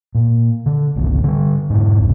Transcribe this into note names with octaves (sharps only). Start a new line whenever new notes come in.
A#2
D3
G#1 C#2 D3
D3 G3
G#2 B2
F1 C2 G#2 B2